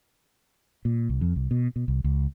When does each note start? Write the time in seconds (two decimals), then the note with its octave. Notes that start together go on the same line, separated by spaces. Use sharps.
0.85 A#2
1.09 C2
1.21 F2
1.36 C2
1.51 B2
1.76 B2
1.88 C2
2.04 C#2